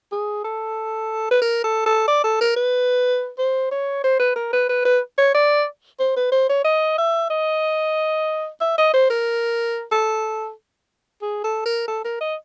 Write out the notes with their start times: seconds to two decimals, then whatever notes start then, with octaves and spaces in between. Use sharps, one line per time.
0.12 G#4
0.44 A4
1.31 B4
1.42 A#4
1.64 A4
1.86 A4
2.08 D5
2.24 A4
2.41 A#4
2.57 B4
3.39 C5
3.72 C#5
4.04 C5
4.20 B4
4.36 A#4
4.53 B4
4.69 B4
4.85 B4
5.18 C#5
5.34 D5
5.99 C5
6.17 B4
6.32 C5
6.49 C#5
6.65 D#5
6.98 E5
7.30 D#5
8.61 E5
8.78 D#5
8.94 C5
9.10 A#4
9.92 A4
11.22 G#4
11.44 A4
11.66 A#4
11.88 A4
12.05 A#4
12.21 D#5